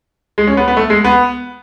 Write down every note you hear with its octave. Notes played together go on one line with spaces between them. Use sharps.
G#3
C#4
B3
B3
A3
G#3
B3